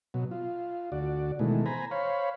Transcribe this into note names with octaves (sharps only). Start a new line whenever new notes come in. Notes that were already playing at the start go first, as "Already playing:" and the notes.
B2 F#3
F4
D2 F#4 D5
B2 D#3 E3 G#3 A3
C5 G#5 A#5 B5
C5 C#5 F5 B5